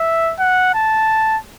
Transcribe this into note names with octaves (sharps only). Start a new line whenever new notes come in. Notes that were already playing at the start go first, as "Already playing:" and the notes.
Already playing: E5
F#5
A5